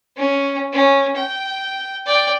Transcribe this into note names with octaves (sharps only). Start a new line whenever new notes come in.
C#4
C#4
G5
D5 G5